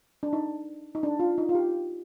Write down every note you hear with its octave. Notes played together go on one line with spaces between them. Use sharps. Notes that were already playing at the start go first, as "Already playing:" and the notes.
D4
D#4
D#4
D4
F4
D#4
F4
G4